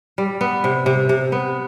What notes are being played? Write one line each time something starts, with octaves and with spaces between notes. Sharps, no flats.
G3
B3
C3
C3
C3
B3